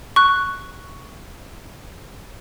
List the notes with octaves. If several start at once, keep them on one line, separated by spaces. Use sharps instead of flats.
C#6 F#6